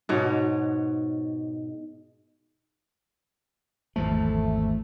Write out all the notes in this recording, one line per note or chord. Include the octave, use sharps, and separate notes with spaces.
G#2 B2 C#5
G#1 E2 F3 A3